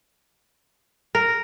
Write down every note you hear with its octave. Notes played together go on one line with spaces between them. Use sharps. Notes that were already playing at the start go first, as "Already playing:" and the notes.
A#4